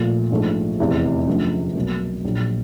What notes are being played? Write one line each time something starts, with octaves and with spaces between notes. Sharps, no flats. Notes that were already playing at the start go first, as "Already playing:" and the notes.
Already playing: A#2 F3 A3
A#1 G#2 F3 A3
F1 E2 C3 E3
F#2 D3 F3 A3
B1 B2 F#3 A#3
A#1 A#2 F#3